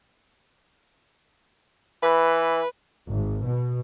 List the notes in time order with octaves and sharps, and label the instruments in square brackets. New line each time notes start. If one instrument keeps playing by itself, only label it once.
[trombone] E3 [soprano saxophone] B4
[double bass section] G#1
B2